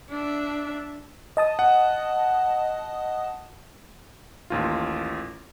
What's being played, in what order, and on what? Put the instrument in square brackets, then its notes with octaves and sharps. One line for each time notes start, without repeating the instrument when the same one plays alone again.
[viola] D4 E5
[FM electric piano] D#5 A5 D#6
[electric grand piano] F#5
A1 D#2 F4